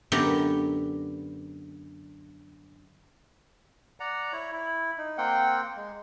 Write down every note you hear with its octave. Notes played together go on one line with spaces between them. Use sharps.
F#2 D3 B3 G4 G5 A#5
D5 F#5 A#5
E4 C#5
E4
D#4
A#3 C4 F#5 G5
G#3